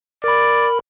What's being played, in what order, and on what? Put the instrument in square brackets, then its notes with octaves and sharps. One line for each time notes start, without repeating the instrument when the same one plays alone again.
[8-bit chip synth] A#4 B5 [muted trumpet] D5